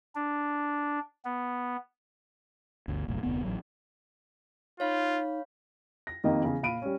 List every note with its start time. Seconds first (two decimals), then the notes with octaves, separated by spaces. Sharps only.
0.15 D4
1.25 B3
2.88 G1 D2
3.08 F#1 B1 A2
3.23 F1 D2 B3
3.44 A1 F#3
4.80 D#4 F4 C#5 F5 B5
6.07 A#6
6.24 F2 D#3 A#3 D#4 G4 D#5
6.42 E2 C#3
6.63 A#2 F5 B5 D7 D#7
6.82 G3 C#4